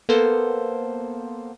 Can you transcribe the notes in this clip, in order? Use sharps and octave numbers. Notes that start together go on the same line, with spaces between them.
A#3 B3 A4 C5